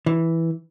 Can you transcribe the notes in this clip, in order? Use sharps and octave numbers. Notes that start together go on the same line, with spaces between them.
E3